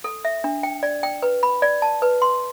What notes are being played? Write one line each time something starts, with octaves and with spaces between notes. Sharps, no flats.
A4
E5
D4
G5
D5
G5
B4
B5
D5
A5
B4
C6